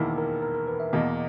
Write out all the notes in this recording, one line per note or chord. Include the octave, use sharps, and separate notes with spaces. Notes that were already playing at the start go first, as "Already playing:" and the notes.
Already playing: E1 E2 D#3 A#3 E4
A#4
A#4
A#4
B4
E5
E2 B2 A#3 D#5